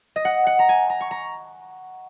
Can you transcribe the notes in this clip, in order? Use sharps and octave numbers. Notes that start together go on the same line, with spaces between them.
D#5
F#5
F#5
A#5
G#5
A#5
C#6
A#5